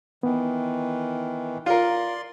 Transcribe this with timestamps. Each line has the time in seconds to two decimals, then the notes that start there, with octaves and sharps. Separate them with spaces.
0.23 D#3 E3 B3
1.66 F4 A#4 D5 C6